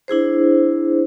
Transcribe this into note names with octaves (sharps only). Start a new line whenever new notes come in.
D4 E4 G#4 C5